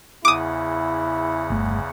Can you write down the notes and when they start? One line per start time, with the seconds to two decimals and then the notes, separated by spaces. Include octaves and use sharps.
0.25 E2 C#3 E4 F#5 D6 D#6
1.50 G1 A3